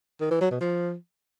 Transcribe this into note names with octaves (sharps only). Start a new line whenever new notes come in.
D#3
E3
F#3
B2
F3